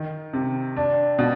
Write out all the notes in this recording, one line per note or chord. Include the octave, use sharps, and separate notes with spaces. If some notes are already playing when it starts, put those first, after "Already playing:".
Already playing: D#3
C3
D4
B2